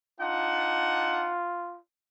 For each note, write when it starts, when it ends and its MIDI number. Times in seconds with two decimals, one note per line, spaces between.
0.20 1.36 62
0.20 1.36 63
0.20 1.78 65
0.20 1.36 78